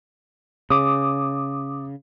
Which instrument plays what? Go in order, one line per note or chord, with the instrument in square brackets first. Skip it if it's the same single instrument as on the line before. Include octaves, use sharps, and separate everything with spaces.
[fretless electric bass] C#3 [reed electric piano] D6 D#6